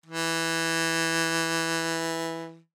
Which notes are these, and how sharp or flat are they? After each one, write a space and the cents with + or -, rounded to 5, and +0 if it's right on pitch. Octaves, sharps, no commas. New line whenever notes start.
E3 -5